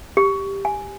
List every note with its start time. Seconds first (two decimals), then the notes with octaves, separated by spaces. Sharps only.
0.17 G4
0.65 G#5